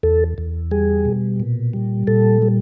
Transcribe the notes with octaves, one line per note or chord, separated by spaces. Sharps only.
E2 A4
E2
G3 G#4
B2
A#2
G3
A#2 A4
G3